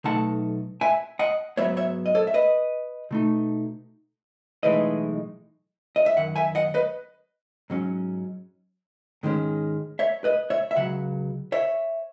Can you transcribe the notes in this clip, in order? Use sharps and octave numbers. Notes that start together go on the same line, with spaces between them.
B1 B2 A3 D#4 F#5 A5
E5 G#5
D#5 F#5
G#2 F#3 B3 C#5 E5
C#5 E5
D#5
A4 C#5
E5
B4 D#5
B2 A3 D#4
B1 A2 E3 G#3 D#4 B4 D#5
D#5
E5
F#2 D#3 F#5
E5 G#5
D#5 F#5
B4 D#5
G#2 F#3 C#4
G#2 D#3 G#3 C#4
C#5 E5
B4 D#5
C#5 E5
E5
C#2 C#3 F#3 F#5
C#5 E5